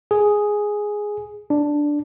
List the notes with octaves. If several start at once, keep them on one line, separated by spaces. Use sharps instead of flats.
G#4
D4